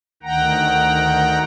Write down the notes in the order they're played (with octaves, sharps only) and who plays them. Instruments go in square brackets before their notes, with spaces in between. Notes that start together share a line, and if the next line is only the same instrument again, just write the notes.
[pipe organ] D2 D#3 F#5 G5 A#5